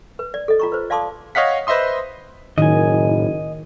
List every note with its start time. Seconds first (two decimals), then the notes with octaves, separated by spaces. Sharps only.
0.19 B4
0.34 D5
0.48 A4 D#5
0.59 F4 A#5 C#6
0.72 B4 C5
0.90 D5 F5 A5 C6 D6 D#6
1.35 C#5 D#5 F5 F#5 B6
1.67 B4 C5 D#5 E5 C6 D#6
2.58 F#1 A2 D#3 D#5 G#5